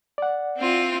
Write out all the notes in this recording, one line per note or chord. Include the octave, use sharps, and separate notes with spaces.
D5 F#5
C4 E4 F4